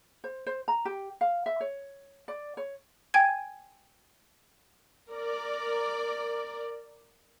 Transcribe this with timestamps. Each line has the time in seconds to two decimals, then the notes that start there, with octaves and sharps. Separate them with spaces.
0.24 C5
0.47 C5
0.68 A#5
0.85 G4
1.21 F5
1.46 E5
1.61 C#5
2.28 D5
2.57 C#5
3.14 G5 G#5 G#6
5.11 A#4 D5